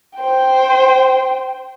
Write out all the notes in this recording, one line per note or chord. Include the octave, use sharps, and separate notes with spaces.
C5 G5